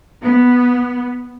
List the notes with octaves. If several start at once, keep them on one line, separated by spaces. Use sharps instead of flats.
B3